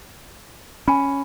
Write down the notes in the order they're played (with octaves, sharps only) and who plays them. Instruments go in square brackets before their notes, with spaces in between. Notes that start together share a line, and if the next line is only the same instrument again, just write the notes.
[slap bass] C#4 [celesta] G#5 B5